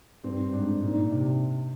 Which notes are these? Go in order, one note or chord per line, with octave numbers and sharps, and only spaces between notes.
G2 C4
G#2 D4
A#2 D#4
C3